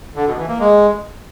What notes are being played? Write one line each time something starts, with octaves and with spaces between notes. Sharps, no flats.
D3
B2
E3
A#3
G#3